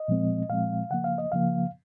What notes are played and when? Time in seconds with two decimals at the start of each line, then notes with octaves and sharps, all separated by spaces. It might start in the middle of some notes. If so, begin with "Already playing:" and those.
Already playing: D#5
0.08 A#2 F3 G#3 C4
0.50 A#2 F3 G#3 C4 F5
0.90 C#3 F3 A#3 F#5
1.04 F5
1.18 D#5
1.32 C#3 F3 A#3 F5